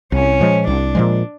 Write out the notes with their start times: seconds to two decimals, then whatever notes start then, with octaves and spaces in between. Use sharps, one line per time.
0.12 C2 C#4
0.40 A#2 F3 G#3
0.67 C2 D4
0.95 A#2 F3 G#3